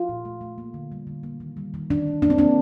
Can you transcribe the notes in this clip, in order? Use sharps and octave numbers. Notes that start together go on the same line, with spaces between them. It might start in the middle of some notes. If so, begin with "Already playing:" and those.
Already playing: F4
A#2
A3
A3
A#3
D3
G3
D3
A#3
D#3
G3
D#3
D#3 D4
D#3
A#3 D4
C4
A#3 D4